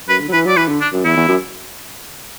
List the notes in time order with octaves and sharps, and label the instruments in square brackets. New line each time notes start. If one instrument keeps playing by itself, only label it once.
[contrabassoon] F#2 [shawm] B4
[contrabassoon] D3
F#3
[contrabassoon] E3 [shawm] B4
[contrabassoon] F#3 [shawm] D5
[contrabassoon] E3 [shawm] B4
[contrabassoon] D3
[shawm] D4
[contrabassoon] F#2
[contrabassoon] E2 [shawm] E4
[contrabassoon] E2
F#2